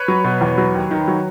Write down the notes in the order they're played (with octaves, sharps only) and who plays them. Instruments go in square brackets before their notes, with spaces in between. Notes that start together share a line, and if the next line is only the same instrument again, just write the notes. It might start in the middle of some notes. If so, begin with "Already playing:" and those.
Already playing: [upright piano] B4 C#5
F#3
B2
E2
F#3
D#2
D#3
F#3